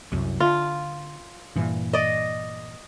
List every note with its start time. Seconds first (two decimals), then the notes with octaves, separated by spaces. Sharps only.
0.12 C2 F#2
0.40 D3 F4
1.56 G2 A#2 E3
1.93 D5 D#5